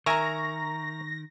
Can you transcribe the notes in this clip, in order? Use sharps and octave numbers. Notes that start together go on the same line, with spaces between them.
D#3 A#4 E5 G#5 A#5 C#6 A#6